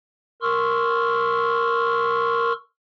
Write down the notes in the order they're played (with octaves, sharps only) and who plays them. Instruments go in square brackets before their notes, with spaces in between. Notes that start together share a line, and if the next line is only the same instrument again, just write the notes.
[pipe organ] A#4 C6 C#6 E6 F6